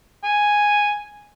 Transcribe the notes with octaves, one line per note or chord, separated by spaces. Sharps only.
G#5